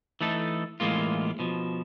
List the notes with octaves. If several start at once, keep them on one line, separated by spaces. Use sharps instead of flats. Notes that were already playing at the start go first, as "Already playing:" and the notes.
E3 A3 D#4 A4
A2 E3 G#3 A#3 F4
B2 F3